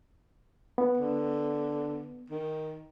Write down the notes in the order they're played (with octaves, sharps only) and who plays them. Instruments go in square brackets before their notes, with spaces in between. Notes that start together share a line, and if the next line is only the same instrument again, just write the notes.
[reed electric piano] B3
[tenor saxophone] D3
D#3